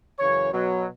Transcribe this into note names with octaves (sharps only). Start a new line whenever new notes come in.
F#2 C#3 E3 C#5
B2 F#3